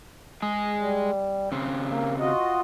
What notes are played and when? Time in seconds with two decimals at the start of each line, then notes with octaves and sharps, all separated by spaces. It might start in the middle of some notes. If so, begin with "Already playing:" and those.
0.42 G#3 G#4
0.78 G3
1.52 C#3 C4
1.86 A#3
2.20 F4 F#4 D#5